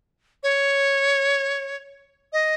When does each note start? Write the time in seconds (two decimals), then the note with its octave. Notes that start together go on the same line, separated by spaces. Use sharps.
0.43 C#5
2.33 D#5